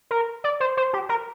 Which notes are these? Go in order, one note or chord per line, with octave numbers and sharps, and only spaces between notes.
A#4
D5
C5
C5
G4
A#4